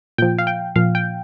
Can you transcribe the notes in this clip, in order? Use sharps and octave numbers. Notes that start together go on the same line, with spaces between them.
A#2 F3 G5
F5
G5
A#2 F3 F5
G5